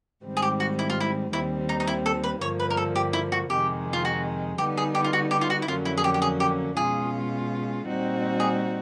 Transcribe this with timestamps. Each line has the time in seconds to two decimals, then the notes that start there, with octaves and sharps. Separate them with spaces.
0.24 G#2 D#3 G3 C4
0.37 G#4
0.42 G4
0.60 F#4
0.79 E4
0.90 F4
1.00 E4
1.33 D#2 D#3 G3 C4 E4
1.69 D#4
1.80 D#4
1.87 E4
2.06 A4
2.23 B4
2.41 G2 D3 F3 A#3 C#5
2.60 B4
2.70 A#4
2.77 A4
2.95 G4
3.13 E4
3.32 F#4
3.50 F2 C3 D#3 G#3 G4
3.93 F4
4.05 F#4
4.58 D3 G3 B3 D#4 G4
4.77 G#4
4.95 G4
5.04 F4
5.13 F#4
5.31 G4
5.41 F4
5.50 F#4
5.62 E4
5.68 F2 D3 F#3 A#3 C#4 F4
5.85 E4
5.97 G#4
6.04 G4
6.14 G4
6.22 G#4
6.40 G4
6.76 B2 G#3 C#4 F4 G#4
7.86 A#2 G3 C4 D#4 F#4
8.40 G#4